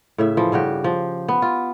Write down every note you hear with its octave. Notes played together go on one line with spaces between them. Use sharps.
A2 C#3 E5
E3 F3
G2 C#3 F#4 G4
F3
B3
F4